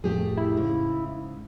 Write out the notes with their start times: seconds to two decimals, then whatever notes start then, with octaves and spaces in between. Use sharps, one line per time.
0.04 F2 A2 F3 A3 G4 G#4
0.37 E4
0.57 G#2 C#3